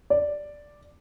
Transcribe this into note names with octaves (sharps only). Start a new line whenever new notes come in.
D5